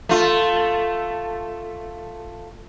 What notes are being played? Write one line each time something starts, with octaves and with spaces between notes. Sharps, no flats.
A3 F4